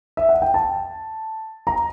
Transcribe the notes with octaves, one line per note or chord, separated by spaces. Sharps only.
E5
F#5
G5
A5
A#5